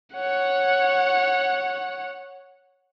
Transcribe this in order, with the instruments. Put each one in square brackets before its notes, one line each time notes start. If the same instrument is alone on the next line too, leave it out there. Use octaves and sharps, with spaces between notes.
[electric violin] C#5 F#5